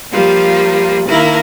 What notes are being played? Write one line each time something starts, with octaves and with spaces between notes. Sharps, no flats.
F3 G3 A#3 F4
D#3 A#3 E4 A#4